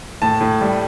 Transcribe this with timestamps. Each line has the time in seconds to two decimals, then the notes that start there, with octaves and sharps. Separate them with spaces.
0.22 A2 A5
0.41 A2
0.61 G3